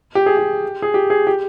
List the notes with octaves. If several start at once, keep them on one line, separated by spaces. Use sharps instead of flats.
G4
G#4
G4
G#4
G4
G#4
G4